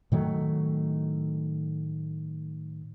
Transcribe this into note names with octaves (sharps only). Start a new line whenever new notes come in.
A2 D#3 F#3 A3